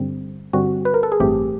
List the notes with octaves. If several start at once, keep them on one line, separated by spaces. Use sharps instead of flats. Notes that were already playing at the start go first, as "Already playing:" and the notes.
Already playing: G2 D3 G3 C4
G2 D3 G3 C4 F#4
B4
A#4
A4
G#4
A1 G2 E3 A3 C4 G4